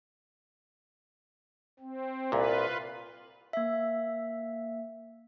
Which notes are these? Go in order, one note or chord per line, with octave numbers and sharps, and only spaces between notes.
C4
C2 A#2 F4 B4
A#3 E5